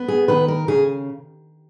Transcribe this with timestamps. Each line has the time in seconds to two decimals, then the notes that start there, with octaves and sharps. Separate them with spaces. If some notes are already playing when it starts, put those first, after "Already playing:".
Already playing: B3
0.08 G#4
0.28 D#3 B4
0.48 A#4
0.68 C#3 G#4